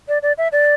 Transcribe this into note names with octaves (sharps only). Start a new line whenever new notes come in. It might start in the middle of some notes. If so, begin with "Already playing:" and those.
D5
D5
E5
D5